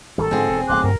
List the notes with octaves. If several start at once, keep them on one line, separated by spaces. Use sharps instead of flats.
G#1 D#3 G3 A4
G#2 D3 F3 C4 G#4
E1 D#2
D1 B1 A3 C6 D6 F#6
G2 A#4